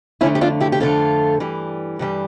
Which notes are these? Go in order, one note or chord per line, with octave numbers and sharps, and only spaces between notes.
F2 D3 A3 C#4 E4
G4
D4 F4
E4 G4
G4
F2 D3 A3 F4 A4
G2 E3 G3
G2 E3 G3